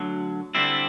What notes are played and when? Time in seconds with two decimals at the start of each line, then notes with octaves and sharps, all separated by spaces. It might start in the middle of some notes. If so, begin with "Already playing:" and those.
Already playing: D2 D3 F#3
0.55 D3 G3 C4 E4